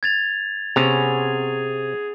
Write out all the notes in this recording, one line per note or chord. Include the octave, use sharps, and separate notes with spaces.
G#6 A6 F7
C3 B3 C#4 G#4 F7